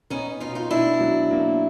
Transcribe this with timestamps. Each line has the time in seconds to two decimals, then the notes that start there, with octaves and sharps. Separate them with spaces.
0.10 B3 C#4 D#4
0.40 B2 D#4 F4
0.55 D#4 F4
0.71 B2 D4 E4
1.00 F#3
1.31 A#3